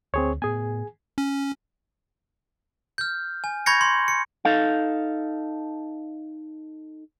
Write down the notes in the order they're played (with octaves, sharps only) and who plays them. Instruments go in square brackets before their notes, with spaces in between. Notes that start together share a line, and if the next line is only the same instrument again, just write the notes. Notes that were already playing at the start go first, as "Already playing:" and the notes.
[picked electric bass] D2 [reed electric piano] C4 G#4 C#5
[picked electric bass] A2 B3 [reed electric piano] G#4 G#5
[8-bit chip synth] C#4
[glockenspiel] F6 G6
G#5
B5 C#6 G6 G#6 A#6 C#7
C6
C#7
[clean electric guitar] D#4 A4 F5